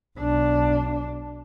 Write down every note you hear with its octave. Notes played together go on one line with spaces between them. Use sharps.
B1 D4